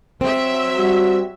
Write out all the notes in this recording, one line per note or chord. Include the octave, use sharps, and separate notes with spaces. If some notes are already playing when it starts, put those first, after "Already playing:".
F#3 C4 E5
G3 F#4